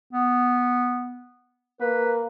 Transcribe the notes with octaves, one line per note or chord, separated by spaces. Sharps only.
B3
A#3 B4